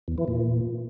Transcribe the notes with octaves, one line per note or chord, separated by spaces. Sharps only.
E2
E3
A#2